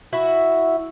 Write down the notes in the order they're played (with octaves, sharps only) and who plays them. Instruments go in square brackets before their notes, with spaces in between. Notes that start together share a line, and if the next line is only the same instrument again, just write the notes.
[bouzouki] E4 F#4 E5